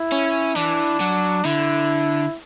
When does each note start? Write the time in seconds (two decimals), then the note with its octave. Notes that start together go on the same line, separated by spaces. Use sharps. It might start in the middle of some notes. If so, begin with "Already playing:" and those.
Already playing: E4
0.12 C#4
0.56 E3 D4
1.00 F#3
1.45 D3 E4